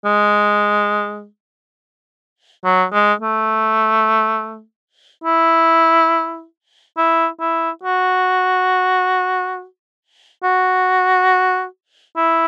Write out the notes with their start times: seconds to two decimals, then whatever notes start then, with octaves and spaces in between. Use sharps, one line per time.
0.05 G#3
2.64 F#3
2.93 G#3
3.21 A3
5.24 E4
6.98 E4
7.40 E4
7.84 F#4
10.44 F#4
12.17 E4